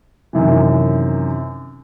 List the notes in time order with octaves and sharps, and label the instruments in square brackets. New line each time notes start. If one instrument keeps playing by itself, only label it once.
[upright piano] F#2 C3 D#3 E3